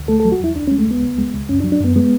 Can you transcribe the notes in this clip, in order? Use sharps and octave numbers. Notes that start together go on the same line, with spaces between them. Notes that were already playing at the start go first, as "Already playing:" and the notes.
Already playing: D2
A3 A4
A4
F#3
F#4
E2 E4
D2 D4
C#4
G#3
A3
D2 B3
C#2
G#3
C#2
F#2 C#4
D4
F#3
D4
F#2 B3
G#3 B3